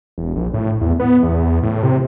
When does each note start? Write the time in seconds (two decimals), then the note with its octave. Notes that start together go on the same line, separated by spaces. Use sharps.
0.18 E1
0.36 A#1
0.54 A2
0.81 E2
1.00 B3
1.23 E2
1.63 A2
1.83 C3